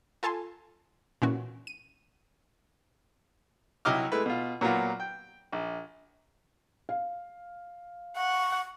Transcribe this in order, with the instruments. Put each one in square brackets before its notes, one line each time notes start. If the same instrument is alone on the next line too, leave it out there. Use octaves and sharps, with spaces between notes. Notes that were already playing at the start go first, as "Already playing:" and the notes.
[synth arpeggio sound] F4 A4 G#5 A5 C6
A#2 E3 C#4 F#4
D#7
[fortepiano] C2 F#3 E4 D#5 D6 F6
G#3 A3 E4 B4
B2 F4
A#2 F#3 A#3 B3 F4
G5
A#1
[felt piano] F5
[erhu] F#5 [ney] C#6